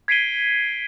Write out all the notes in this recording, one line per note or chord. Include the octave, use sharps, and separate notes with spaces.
G#6 B6 C7 D7 D#7 G7